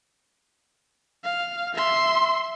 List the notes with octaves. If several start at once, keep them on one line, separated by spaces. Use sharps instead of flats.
F5
E5 C6